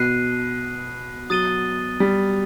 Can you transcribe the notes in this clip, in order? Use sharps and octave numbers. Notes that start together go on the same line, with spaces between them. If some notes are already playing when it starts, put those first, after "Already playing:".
Already playing: B2 F#6 C7 D#7
F#3 D#6 A6 D#7 G7
G3